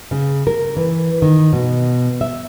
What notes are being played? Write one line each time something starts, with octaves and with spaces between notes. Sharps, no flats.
C#3
A#4
E3
D#3
B2
E5